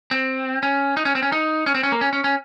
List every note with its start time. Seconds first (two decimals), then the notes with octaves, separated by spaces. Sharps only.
0.11 C4
0.63 C#4
0.97 D#4
1.05 C#4
1.15 C4
1.23 C#4
1.32 D#4
1.66 C#4
1.75 C4
1.83 C#4
1.92 A#3
2.01 C#4
2.13 C#4
2.24 C#4